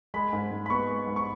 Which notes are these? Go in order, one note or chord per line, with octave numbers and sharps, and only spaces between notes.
G#3 B5
G#2
G#2
B5
B3 C#6
G#3
G#2
C#6